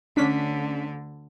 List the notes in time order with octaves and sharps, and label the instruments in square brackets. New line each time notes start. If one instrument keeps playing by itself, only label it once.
[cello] D2 D3 [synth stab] C#4 D4 B6